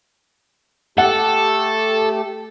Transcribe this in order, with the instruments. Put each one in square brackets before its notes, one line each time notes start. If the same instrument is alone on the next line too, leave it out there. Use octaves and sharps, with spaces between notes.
[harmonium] A3 G4 [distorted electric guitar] A4 [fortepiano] F#5